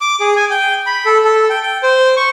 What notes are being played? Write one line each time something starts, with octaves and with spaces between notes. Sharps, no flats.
D6
G#4
G#5
G5
B5
A4
A4
G5
G5
C5
C#6